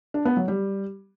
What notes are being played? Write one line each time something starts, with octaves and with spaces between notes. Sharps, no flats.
D4
B3
F#3
G3